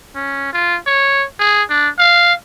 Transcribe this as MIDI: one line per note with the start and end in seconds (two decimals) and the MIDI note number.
0.15 0.49 61
0.53 0.77 65
0.87 1.25 73
1.40 1.63 68
1.70 1.89 62
1.99 2.34 77